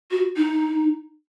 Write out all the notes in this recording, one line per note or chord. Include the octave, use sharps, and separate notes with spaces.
F#4
D#4